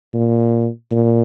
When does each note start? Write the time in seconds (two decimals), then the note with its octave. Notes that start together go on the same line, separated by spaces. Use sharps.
0.14 A#2
0.91 A#2